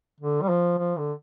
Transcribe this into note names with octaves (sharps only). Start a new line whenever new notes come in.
D3
G3
F3
F3
D3